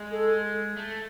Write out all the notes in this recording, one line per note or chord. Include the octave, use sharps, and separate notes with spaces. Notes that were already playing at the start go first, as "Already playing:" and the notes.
Already playing: G#3
A4
A3